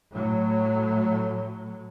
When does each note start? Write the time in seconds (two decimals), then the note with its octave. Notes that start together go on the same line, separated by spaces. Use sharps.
0.12 A2 F#3